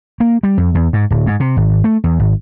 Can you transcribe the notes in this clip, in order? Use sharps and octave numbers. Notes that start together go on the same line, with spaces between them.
A#3
G3
F2
E2
G#2
D1
G#2
C3
G#1
A3
E2
G#1